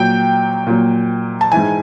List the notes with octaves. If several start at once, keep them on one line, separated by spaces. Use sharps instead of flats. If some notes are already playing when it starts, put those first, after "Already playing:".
Already playing: A#2 F#3 G5
A#2 F#3
A5
G#2 E3 G#5